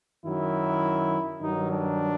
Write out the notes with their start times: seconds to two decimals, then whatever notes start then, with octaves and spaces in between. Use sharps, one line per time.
0.23 F#2 D#3 F#3 E4
1.40 G2 D#3 F#3 D#4
1.70 D4